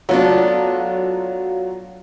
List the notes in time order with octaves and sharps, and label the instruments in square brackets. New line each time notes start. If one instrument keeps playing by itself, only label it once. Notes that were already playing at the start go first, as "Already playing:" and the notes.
[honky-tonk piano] F#3 F4 [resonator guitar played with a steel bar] A3 B3 D4